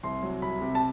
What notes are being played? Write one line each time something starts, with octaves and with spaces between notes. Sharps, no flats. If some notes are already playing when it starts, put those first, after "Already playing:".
C2 C6
F#3
C2 B5
C3
A5